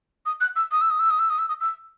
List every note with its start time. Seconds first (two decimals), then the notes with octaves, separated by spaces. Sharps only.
0.26 D#6
0.41 F#6
0.56 E6
0.72 D#6
0.81 E6
0.90 D#6
1.00 E6
1.10 D#6
1.19 E6
1.30 D#6
1.39 E6
1.49 D#6
1.61 E6